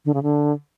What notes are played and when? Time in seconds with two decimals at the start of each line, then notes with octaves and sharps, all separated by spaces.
0.05 D3
0.14 C#3
0.23 D3